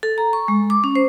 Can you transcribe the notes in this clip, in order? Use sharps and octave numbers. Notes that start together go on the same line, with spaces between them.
A4
A#5
C#6
G#3
D6
C#4
C5